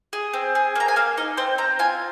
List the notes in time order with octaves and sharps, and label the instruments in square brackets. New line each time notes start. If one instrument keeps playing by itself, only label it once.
[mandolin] G#4
C4
G#4
A#3 A#5
G#5
A#3 F5
D#4 D#5
C4 C5
C4 A#5
F4 G#5